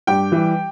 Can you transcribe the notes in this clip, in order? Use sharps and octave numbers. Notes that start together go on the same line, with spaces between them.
G2 G4 G5
E3 G3